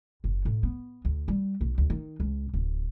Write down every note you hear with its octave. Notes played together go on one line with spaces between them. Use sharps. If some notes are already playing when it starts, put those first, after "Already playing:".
F#1
A2
B3
D2
G3
B1
D2
D#3
C#2
D1